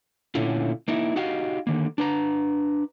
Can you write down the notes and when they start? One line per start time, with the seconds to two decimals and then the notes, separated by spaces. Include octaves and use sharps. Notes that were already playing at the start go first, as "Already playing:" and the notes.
0.35 A#2 D3 A3 C#4 E4 F4
0.88 A#3 D#4 E4
1.16 D#4 F#4 G4 D#5 F5
1.67 D3 D#3 A#3
1.98 D4 B4 A#5